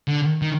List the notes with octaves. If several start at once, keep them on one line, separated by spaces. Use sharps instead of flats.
D3
D#3